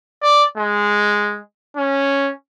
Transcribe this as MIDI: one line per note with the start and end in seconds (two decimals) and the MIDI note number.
0.22 0.44 74
0.57 1.39 56
1.77 2.32 61